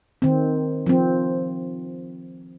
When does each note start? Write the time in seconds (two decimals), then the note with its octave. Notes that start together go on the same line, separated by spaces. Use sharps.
0.22 D#3 C4
0.86 F3 C4